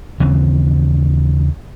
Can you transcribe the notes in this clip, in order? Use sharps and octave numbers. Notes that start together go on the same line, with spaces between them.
D#2 C#3 E3 C4